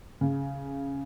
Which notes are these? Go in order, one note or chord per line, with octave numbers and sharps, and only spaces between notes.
C#3